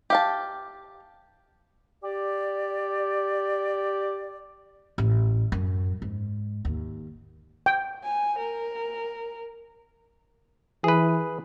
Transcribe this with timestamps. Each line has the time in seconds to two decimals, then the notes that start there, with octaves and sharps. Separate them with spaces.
0.10 G4 F5 A5
2.03 G4 D5
4.98 A1
5.52 F#2
6.02 G#2
6.65 D#2
7.66 G5
8.04 G#5
8.39 A#4
10.84 E3 G#4 B4